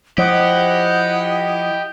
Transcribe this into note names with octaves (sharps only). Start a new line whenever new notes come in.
F3 E4 G4 D#5 F#5